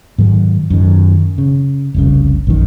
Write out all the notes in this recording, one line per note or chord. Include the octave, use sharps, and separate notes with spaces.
G#2 D#3 F#3
F#2 D#3
C#3
F1 C2 C#3
A#1 F#2 D#3